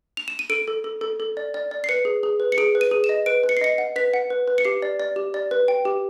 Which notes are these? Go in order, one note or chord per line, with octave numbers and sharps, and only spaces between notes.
F7
E7
D#7
A4 D7
A4
A4
A4
A4
D5
D5
D5
C7
B4 C#7
G#4
G#4
B4
C#7
G#4 D7
B4
D#7
G#4
E7
D#5
B4 D7
B4
C#7
C7
D#5 C#7
F#5
B4 B6
F#5
B4
B4
C#7
G4 C7
D5
D5
G4
D5
B4
G5
G4